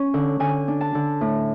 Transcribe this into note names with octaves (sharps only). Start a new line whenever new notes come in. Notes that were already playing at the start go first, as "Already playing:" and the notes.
Already playing: C#4
D3
D3 G#5
D4
A5
D3
A2